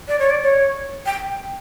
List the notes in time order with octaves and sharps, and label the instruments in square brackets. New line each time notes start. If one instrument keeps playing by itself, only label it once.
[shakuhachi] D5
C#5
D5
C#5
G5